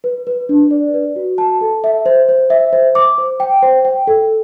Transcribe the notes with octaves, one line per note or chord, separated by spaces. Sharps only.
B4
B4
D4
D5
B4
F#4
A5
A4
E5
C5
C5
E5
C5
D6
C5
G5
C5
G5
A4